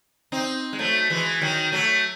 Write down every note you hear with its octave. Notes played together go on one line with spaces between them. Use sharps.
C4 D#4
G#3
F#3 A3
E3 G#3
D#3 F#3
F#3 A3